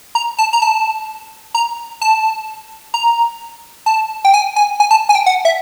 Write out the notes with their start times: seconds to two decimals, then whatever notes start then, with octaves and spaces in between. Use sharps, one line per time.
0.15 A#5
0.38 A5
0.53 A#5
0.62 A5
1.55 A#5
2.02 A5
2.94 A#5
3.86 A5
4.25 G5
4.34 G#5
4.56 G#5
4.80 G#5
4.91 A5
5.09 G#5
5.15 G5
5.26 F#5
5.45 E5